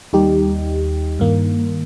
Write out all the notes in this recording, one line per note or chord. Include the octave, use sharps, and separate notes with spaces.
D#2 D#3 G3 D#4 G4
G2 D#3 A#3